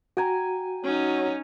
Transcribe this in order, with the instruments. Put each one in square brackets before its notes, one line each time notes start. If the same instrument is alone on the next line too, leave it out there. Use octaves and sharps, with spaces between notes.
[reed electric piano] F#4 [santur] G5 G#5 A#5
[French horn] F#3 [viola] C#4 D#4